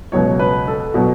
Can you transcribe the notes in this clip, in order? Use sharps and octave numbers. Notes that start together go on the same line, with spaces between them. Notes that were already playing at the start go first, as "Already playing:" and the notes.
C#2 B2 F#3 C#5
B4
A4
B2 F#3 F#4